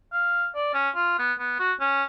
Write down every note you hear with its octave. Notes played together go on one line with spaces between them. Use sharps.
F5
D5
C#4
F4
B3
B3
F#4
C#4